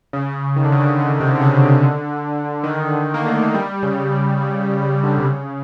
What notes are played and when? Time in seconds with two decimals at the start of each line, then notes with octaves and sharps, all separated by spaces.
0.13 C#3
0.56 D#3
0.64 D3
0.72 C#3
0.80 D3
0.98 C#3
1.20 C3
1.36 D3
1.42 C#3
1.63 D3
2.64 D#3
2.69 D3
3.14 A#3
3.26 A3
3.54 G3
3.83 C#3
4.11 C#3
4.40 C#3
4.60 C#3
4.82 C#3
5.04 D3
5.18 C3
5.25 C#3